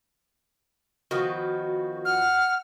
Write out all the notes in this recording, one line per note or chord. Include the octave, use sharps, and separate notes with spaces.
D#3 F3 B3 F#4
F#5 F6